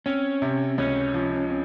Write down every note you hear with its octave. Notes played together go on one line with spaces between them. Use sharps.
C4 C#4
C3
C#2 C#4
F3
C4